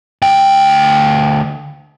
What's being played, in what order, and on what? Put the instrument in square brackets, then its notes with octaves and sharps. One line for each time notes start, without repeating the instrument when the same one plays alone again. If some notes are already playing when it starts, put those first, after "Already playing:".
[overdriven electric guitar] D2 G5